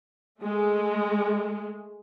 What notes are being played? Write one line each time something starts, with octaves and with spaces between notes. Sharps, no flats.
G#3 A3